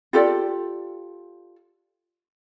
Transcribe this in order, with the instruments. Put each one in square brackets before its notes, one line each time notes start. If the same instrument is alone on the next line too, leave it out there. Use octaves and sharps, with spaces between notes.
[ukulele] F4 G4 A4 D5